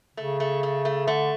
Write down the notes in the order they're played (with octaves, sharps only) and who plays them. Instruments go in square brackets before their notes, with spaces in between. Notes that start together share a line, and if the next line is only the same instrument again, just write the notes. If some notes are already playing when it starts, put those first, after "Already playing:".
[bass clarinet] C#3 [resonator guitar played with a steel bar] A3
[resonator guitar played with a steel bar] A3
A3
A3
[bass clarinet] D3 [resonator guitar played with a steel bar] A3